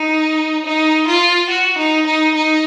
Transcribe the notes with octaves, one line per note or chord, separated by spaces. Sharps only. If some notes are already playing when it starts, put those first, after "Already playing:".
Already playing: D#4
D#4
F4
F#4
D#4
D#4
D#4